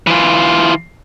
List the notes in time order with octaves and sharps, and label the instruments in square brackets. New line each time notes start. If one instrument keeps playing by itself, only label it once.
[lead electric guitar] E3 F4